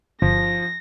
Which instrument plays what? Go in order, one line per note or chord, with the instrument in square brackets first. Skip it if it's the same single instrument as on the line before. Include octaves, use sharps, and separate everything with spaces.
[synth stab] G1 [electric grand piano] F3 [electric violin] A#6